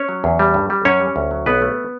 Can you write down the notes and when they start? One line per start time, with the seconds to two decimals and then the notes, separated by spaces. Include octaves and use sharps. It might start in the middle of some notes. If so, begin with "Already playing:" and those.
Already playing: C#4 C#5
0.09 F#3
0.24 E2
0.39 G3
0.54 G2
0.70 G3
0.85 F#2 C#4 C#5
1.00 G3
1.16 D2
1.31 F#3
1.46 B1 B3 B4
1.62 A3